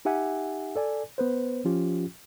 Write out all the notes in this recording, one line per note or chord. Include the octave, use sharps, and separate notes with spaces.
D#4 G4 E5 F#5 G#5
A4 D5 G#5
B3 B4 C5
F3 C#4 F4 G4